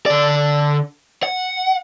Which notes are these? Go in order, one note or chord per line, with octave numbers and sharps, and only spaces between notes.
D3 D5
F#5